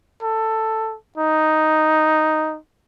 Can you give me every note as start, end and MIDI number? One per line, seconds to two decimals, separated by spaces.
0.22 0.96 69
1.18 2.58 63